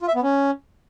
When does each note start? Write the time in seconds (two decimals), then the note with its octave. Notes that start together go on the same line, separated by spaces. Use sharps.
0.01 F4
0.08 E5
0.15 B3
0.23 C#4